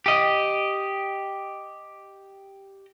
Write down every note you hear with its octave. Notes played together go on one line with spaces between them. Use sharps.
G4 D#5